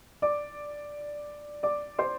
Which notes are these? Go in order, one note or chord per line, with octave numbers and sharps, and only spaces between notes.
D5 D6
D5 D6
C5 C6